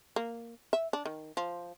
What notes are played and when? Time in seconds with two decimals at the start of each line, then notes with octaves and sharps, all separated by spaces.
0.16 A#3
0.73 E5
0.93 D4
1.05 D#3
1.37 F3